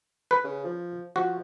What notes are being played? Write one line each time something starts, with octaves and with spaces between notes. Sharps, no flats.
B4
C#3
F3
F3 F#4